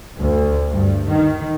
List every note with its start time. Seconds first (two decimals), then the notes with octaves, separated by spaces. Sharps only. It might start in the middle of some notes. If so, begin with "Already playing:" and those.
0.19 D2
0.68 G2
1.06 D#3